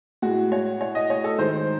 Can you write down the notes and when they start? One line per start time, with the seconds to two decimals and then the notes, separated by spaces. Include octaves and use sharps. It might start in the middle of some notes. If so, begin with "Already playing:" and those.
0.22 A2 G#3 F#4
0.52 C#5
0.81 C#5
0.95 D#5
1.10 C#5
1.24 A4
1.39 G#2 D#3 G#3 C5